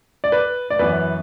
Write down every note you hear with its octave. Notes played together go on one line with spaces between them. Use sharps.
D5
B4
D5
F#2 E3 B3 B4